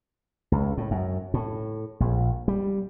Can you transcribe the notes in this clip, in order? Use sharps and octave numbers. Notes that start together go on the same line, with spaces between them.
C#2
A2
F#2
A2
A#1
G3